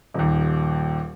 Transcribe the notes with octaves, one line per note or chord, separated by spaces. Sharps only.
D#1 D#2